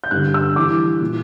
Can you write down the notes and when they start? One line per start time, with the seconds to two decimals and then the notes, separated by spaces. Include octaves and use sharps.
0.04 G6
0.11 G2 D3 F#6
0.34 E6
0.56 G2 E3 D6
1.01 A#2